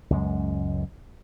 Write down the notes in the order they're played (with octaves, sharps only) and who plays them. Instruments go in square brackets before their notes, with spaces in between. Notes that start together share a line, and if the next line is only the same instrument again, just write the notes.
[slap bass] C#2 F#2 G#3